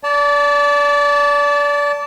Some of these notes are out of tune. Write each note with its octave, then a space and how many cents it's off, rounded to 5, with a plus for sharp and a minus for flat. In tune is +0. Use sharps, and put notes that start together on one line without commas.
D5 -30 A5 +0